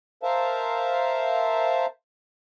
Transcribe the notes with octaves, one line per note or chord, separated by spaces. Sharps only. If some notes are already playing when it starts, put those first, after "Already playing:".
A#4 C5 E5 F5 A5